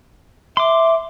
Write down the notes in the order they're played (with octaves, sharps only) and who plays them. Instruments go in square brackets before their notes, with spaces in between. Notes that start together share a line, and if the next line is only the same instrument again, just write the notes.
[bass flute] E5 [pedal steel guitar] C6 D6